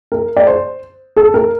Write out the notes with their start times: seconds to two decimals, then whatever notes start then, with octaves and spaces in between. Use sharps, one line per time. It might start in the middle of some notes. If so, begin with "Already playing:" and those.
0.12 A#4
0.36 D5
0.47 C5
1.17 A4
1.34 A#4